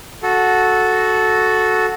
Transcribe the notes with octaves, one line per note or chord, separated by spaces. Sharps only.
F#4 A4